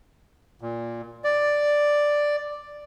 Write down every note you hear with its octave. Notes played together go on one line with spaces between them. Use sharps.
A#2
D5